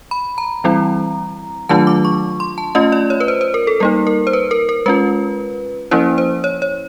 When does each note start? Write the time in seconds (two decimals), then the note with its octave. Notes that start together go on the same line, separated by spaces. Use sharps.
0.11 B5
0.38 A#5
0.64 E3 G3 C4 E4
1.69 D#3 F#3 A3 D4 F4 A5
1.87 D6
2.05 C#6
2.40 C6
2.58 A5
2.75 A3 C#4 F4 D#5
2.92 D5
3.10 C#5
3.20 B4
3.28 C5
3.41 C5
3.54 A#4
3.67 A4
3.80 G3 A#3 D#4 A#4
4.07 A#4
4.27 C5
4.33 B4
4.51 A#4
4.69 A#4
4.86 G#3 C#4 F4 B4
5.91 F3 A#3 C#4 E4 C5
6.18 C5
6.44 C#5
6.62 C#5